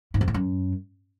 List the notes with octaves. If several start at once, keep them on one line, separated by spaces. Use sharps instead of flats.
G#2
F2
A2
F#2